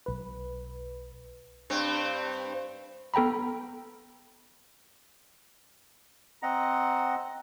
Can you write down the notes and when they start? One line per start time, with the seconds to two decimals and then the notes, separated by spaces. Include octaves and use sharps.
0.06 B1 B4
1.70 G2 C4
3.14 B3 A4 G5 A#5 B5
6.43 C4 D#5 F#5 A#5